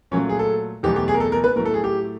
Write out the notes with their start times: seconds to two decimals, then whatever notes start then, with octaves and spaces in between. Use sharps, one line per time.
0.11 A#2 F#3 A3 C#4
0.29 G#4
0.39 A4
0.83 E2 B2 F#3 A3 G4
0.96 G4
1.08 G#4
1.14 A#4
1.20 A4
1.32 A#4
1.44 B4
1.56 A2 F#3 A3 A#4
1.65 A4
1.74 G#4
1.84 G4